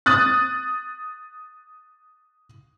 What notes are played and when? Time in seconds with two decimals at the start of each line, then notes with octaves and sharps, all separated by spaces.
0.06 D#6 F#6 A6